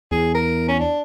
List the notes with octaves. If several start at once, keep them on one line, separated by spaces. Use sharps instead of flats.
E2 G#4
A#4
C#4
D4